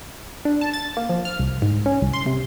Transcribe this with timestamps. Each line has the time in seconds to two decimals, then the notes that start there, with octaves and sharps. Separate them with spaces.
0.45 D4
0.61 A5
0.74 A6
0.97 A#3
1.09 F3
1.25 F6
1.39 C2
1.62 G#2
1.86 C#4
2.02 C2
2.13 C6
2.26 C3